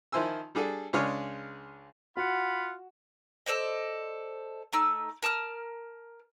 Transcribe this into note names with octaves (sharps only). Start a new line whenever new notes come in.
D#3 F3 E4 C5 G#5 E6
G3 D4 G#4 A4
C#2 G#3 D4 G#4 C#5 F6
F4 F#4 F#5 B5
A4 C5 D5 D#5
A3 D#4 E6
A#4 A5 D#6 F6